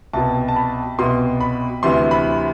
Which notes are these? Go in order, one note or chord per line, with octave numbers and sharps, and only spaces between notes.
C2 B2 A5
A5
B5
C2 B2 C6
B5
D2 C3 E3 C6
B5